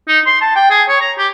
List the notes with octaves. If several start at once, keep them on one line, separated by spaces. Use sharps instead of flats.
D#4
C6
A5
G5
G#4
C#5
A#5
G4